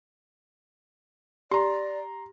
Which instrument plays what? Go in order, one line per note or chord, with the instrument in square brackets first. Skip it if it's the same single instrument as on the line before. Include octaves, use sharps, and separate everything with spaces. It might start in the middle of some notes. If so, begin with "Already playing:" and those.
[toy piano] G4 [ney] D5 [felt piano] A#5 C6